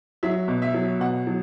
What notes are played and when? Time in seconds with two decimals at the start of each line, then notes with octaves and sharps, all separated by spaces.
0.23 F#3 E5
0.48 B2
0.62 E5
0.74 F#3
1.00 B2 F#5
1.27 F#3